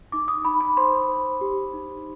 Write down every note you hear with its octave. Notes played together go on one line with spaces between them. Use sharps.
D#4 D6
D#6
D#4 B5
B5
C5 C6
C5
G4
D#4